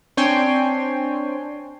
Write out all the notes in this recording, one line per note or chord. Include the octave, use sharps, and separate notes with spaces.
C4 D4 C#5 G5 G#5 C6